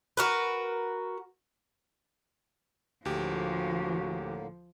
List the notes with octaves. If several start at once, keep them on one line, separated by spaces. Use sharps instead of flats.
F#4 A#4 B4
D2 A2 D3 F3 A#3 F#4 G4